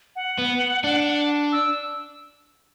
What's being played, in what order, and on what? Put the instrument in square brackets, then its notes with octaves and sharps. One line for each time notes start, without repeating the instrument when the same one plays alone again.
[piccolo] F#5
[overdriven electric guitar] B3
D4
[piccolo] E6